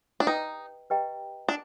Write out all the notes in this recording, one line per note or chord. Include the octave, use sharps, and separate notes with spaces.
D4
D#4 G4 B4 D#5 G5 A#5
G4 B4 D#5 G5 A#5
D4